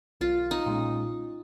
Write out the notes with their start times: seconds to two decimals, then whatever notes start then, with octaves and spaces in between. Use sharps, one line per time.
0.21 B1 F4
0.51 D#4
0.66 A#2 G#3 C#4